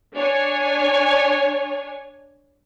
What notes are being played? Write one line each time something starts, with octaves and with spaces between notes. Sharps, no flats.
D4 C#5 G#5